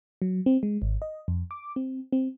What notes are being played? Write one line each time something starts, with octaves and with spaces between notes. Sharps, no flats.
F#3
C4
G#3
G#1
D#5
F2
D6
C4
C4